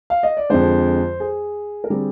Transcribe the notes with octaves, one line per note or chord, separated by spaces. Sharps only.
F5
D#5
D5
F2 D3 G#3 C5
G#4
A#4
D3 G3 C4 G#4